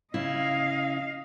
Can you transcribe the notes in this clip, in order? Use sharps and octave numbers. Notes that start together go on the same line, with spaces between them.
C#3 C#4 E4 D#5 F5